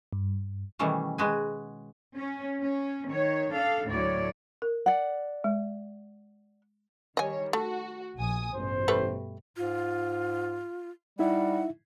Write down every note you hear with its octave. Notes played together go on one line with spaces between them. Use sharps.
G2
B2 D#3 E3 G3 A3 C#4
G#3 F#4 B4 G#5
C#4
C#4
D#3 C#5
D4 A4 F5
D2 A2 F#3 C#5 D5
A#4
D5 F#5
G#3
D#3 G3 C#5 D#5 G#5
A3 F#4
A#1 G#5 D#6
A1 G2 B2 C5
G3 A3 B4
G#2 F4
G3 D#4 E4 E5 F#5